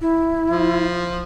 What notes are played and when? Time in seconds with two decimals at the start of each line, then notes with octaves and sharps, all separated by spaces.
0.01 E4
0.50 F3